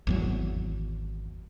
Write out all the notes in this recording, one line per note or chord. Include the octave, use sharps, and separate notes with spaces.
G#1 E2 F#3